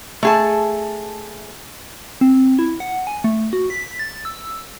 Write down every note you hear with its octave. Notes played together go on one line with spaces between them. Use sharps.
A3 G#4 A5
C4
E4
F#5
G#5
A3
F#4
B6
A6
E6